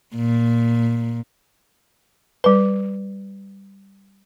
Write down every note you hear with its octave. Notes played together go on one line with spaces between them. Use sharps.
A#2
G3 B4